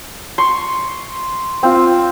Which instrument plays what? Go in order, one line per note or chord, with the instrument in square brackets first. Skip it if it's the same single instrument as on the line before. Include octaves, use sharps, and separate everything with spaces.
[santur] C6 C#6
C4 F4